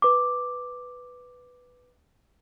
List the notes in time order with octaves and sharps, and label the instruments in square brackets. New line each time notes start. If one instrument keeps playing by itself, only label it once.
[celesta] B4 D6